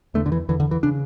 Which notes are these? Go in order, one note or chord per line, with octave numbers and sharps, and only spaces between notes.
E2 D3 A3
D3
E3
E2 D3 E3
D3
E3
C#3 D4